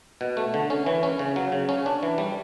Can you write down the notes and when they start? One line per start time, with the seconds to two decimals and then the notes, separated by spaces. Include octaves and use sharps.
0.21 B2
0.37 A3
0.54 D3
0.70 C#4
0.86 E3
1.03 C#4
1.19 C#3
1.36 F#3
1.52 C#3
1.69 C#4
1.86 D4
2.03 E3
2.18 G3